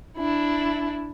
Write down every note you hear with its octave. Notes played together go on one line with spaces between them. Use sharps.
D4 E4